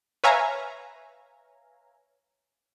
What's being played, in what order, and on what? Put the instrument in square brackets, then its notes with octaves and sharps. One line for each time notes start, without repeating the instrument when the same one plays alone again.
[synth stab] B4 C#5 E5 F5 G#5 A#5